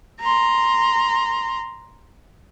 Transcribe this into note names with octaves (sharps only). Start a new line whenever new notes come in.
A#5 C6